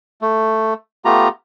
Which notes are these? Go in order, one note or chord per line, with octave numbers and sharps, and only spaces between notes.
A3
A3 B3 F4 G4 A#5